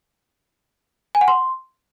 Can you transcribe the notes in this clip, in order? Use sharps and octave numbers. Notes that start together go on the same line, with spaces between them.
G#5
F#5
C6